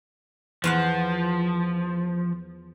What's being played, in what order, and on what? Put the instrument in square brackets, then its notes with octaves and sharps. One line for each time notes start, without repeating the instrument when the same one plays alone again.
[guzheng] E2 F5 F#5 [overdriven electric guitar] F3